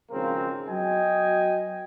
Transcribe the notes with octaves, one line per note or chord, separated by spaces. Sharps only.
G#1 C#3 F3 A#3 C4 A#4
F#3 B3 F#4 D#5 G5 G#5